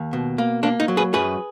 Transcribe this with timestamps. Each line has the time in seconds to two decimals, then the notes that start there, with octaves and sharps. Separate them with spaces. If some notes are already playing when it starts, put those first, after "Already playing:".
Already playing: D#2
0.13 B2
0.38 A#3
0.63 A#3 D4
0.80 D#4
0.88 F#3
0.97 G#4 B4
1.13 F#2 G#4 B4